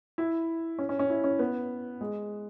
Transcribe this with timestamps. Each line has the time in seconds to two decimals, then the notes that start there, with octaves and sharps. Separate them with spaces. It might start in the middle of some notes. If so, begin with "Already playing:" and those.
0.18 E4
0.79 C#4
0.89 C#4
0.99 C#4
1.10 E4
1.24 C#4
1.39 B3
2.01 G#3